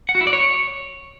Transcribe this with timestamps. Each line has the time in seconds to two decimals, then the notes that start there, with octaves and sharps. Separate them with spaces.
0.09 F#5
0.15 F#4
0.21 E4
0.27 D5
0.33 C#5